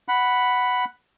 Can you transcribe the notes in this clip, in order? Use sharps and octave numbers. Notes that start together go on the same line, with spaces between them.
F#5 B5